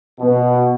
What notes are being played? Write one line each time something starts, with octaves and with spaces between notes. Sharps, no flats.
B2